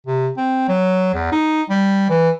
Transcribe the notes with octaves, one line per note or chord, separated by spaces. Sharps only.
C3
C4
F#3
E2
D#4
G3
E3